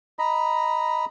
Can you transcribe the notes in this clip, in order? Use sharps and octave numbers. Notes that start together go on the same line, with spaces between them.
D#5 A#5 B5